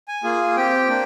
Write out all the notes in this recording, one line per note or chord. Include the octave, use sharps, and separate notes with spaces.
G#5
A#3 F4 G#4
C4 G4 G5
A#3 D4